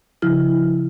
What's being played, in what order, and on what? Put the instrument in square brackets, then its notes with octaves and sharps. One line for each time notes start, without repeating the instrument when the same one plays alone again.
[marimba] C#3 F3 E4 F6